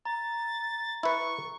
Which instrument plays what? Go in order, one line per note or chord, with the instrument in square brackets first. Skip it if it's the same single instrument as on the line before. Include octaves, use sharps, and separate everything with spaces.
[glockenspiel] A#5 [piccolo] A6
[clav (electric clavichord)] E4 B4 [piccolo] C#6